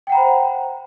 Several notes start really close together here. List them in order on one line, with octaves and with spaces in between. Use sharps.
G5 F#5 A#5 B5 C5